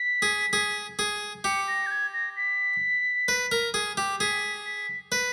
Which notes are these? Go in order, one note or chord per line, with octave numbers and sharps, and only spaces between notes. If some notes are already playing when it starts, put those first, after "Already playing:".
Already playing: B6
G#4
G#4
G#4
G4 C#7
A#6
G6
G#6
A#6
B6
B4
A#4
G#4
G4
G#4 B6
B6
B4 B6